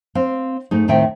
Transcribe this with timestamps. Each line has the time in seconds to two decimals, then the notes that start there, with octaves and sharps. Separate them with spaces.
0.15 C4 F5
0.71 G#2 A3 D#4
0.88 D#2 A2 D#3 C4 E5 G5